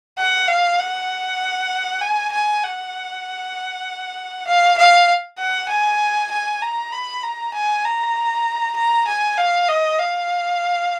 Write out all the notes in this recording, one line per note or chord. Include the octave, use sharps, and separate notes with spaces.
F#5
F5
F#5
G#5
G#5
F#5
F5
F5
F#5
G#5
G#5
A#5
B5
A#5
G#5
A#5
A#5
G#5
F5
D#5
F5